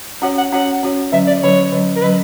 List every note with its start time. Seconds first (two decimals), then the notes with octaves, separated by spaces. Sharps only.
0.22 C#4 F#4 C#5 F#5
0.38 F#5
0.52 C#4 F#4 C#5 F#5
0.83 C#4 F#4 C#5
1.12 D3 F#3 C#4 E5
1.27 D5
1.42 D3 F#3 C#4 C#5
1.72 D3 F#3 C#4
1.96 A#4
2.02 D3 F#3 C#4 B4